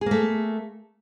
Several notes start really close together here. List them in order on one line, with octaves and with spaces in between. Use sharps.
G#4 A#3 A3